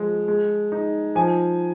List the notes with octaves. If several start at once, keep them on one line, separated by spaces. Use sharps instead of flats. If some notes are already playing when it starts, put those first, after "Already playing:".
Already playing: F3 G#3
G#3
D#4
F3 G#5